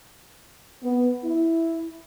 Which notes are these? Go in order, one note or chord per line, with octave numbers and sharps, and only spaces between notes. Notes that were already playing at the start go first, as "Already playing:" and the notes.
B3
E4